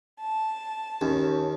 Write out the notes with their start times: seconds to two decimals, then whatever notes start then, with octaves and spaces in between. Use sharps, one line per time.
0.19 A5
1.01 D#2 C#4